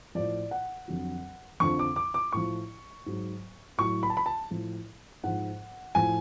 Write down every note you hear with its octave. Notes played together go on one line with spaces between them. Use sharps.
A2 F3 D5
F#5
F2 D3 F#3
F2 D3 F3 C#6
D6
D6
D6
A2 F3 C#6
G#2 F#3
A2 F#3 C#6
B5
A5
B5
A5
A2 F3
G#2 F3 F#5
A2 F3 G#5